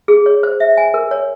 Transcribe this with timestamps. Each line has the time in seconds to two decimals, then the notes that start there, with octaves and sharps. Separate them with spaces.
0.08 G#4
0.26 C#5
0.43 C5
0.60 E5
0.77 G#5
0.94 A#4
1.11 C#5